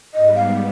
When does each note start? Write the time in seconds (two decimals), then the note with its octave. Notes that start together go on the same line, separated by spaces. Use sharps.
0.14 G#2 G3 B3 D#5
0.36 F5